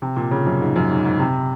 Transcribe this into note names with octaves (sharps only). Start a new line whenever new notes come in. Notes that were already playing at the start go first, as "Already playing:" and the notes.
C3
A#2
C#3
F#2
G#2
F#2
G#2
G#2
C3